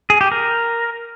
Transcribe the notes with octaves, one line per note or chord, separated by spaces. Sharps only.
G#4
G4
A#4